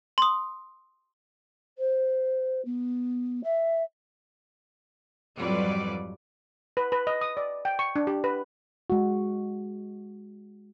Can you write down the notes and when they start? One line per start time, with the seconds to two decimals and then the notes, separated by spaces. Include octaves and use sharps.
0.18 C6 D#6
1.78 C5
2.65 B3
3.43 E5
5.38 F2 G#2 F#3 G3 B4 D5
6.77 B4
6.92 B4
7.07 D#5
7.21 D#6
7.37 D5
7.65 G5
7.79 C#6
7.96 D4
8.07 G4
8.24 B4
8.90 G#3 F#4